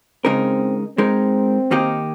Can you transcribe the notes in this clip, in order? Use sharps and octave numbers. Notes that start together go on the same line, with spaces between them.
C#3 G#3 C4 D#4 A#4
G#3 C4 D#4 A#4
D#3 A#3 D#4 G4